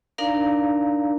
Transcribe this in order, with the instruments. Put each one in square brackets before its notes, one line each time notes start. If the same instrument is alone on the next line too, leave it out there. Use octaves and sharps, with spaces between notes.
[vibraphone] D4 D#4 A#4 D5 F5 A#5